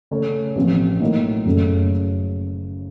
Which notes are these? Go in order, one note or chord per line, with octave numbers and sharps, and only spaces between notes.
C#3 A3 C#4 A4 C#5
A1 A2 F3 C4
A2 F#3 A#3 D#4
F#1 F#2 C#3 A3